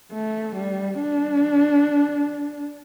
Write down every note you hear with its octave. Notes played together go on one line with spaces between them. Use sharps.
A3
G3
D4